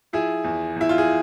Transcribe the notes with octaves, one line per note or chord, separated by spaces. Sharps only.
F3 E4 G#4
E2
E2 E4
F4
G#4